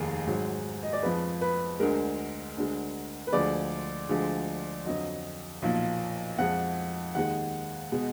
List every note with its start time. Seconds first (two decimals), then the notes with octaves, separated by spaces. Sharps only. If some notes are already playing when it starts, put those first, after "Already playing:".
Already playing: F1 D#2 D#3 G#4
0.27 G#1 G#2 F#3
0.83 D#5
0.93 D5
1.03 F2 F3 G#3 B4
1.41 B4
1.79 D2 D3 G#3 A#4
2.57 D2 D3 G#3
3.27 B4
3.32 D2 D3 F3 G#3 D5
4.09 D2 D3 F3 G#3
4.85 F2 D3 F#3 D#5
5.62 B1 A#2 F3
6.38 F2 F3 G#3 F#5
7.15 D#2 D#3 G#3 F#5
7.92 B2 G#3